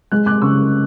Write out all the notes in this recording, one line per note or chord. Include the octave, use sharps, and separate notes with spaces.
G#3 F#6
D6 F#6
C#3 C#6 E6